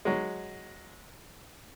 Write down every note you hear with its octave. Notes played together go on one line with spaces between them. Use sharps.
F#3 G#3